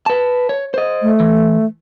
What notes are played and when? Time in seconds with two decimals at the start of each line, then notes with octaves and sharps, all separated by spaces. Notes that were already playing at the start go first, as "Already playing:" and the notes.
0.06 B4 A5
0.49 C#5
0.74 C5 D#5
1.02 A3
1.20 E3